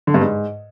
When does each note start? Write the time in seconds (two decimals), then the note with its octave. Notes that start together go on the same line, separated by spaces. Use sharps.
0.07 D3
0.14 G2
0.21 G#2